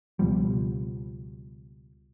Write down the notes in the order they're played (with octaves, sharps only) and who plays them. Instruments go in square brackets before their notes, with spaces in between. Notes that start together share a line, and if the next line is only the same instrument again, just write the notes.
[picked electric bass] C#2 B2 F3 G3